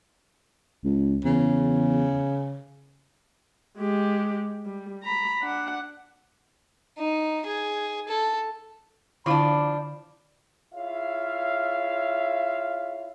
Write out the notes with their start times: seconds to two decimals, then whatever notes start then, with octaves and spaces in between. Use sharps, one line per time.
0.84 C#2
1.24 E2 C#3
3.78 G#3 G4
4.66 G3
5.03 A#5 B5
5.42 D4 F#5
6.98 D#4
7.46 G#4
8.08 A4
9.26 D3 F3 D4 E4 F5 B5
10.74 E4 F4 G#4 C#5 E5 F5